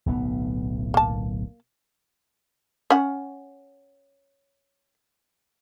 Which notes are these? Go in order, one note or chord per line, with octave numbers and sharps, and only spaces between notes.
D1 B1 B3
A#3 A5
C#4 F#5